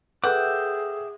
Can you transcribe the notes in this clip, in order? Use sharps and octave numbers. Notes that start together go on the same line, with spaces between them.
G#4 A4 B4 E5 F#5 G5 D6